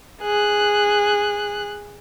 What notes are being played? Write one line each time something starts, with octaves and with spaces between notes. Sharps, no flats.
G#4 F#6